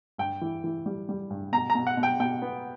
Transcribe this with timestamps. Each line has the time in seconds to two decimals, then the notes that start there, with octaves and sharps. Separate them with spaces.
0.18 G2 G5
0.41 E3
0.64 E3
0.86 G3
1.09 G3
1.30 G2
1.52 B2 A#5
1.70 A#5
1.75 B2
1.87 F#5
1.97 B2
2.03 G5
2.20 B2 G5
2.42 B3